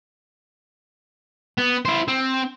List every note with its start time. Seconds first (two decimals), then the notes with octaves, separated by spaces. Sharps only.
1.58 B3
1.85 E4 C5
2.08 C4